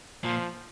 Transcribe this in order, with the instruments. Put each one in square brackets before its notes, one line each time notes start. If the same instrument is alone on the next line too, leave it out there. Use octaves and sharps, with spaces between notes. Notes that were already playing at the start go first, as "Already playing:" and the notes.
[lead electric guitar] A#2 [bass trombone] F3